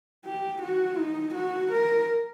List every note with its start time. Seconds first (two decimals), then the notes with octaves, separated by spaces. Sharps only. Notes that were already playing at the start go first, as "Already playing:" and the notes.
0.25 G4
0.62 F#4
0.98 D#4
1.35 F#4
1.72 A#4